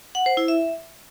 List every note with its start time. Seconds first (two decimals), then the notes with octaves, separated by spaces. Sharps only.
0.15 F#5
0.26 C5
0.37 E4
0.48 E5